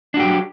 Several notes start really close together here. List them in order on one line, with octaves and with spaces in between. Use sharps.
D4 F#4 G4 F#3